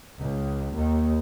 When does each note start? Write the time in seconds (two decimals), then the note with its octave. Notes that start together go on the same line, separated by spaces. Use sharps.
0.20 C#2
0.75 D#2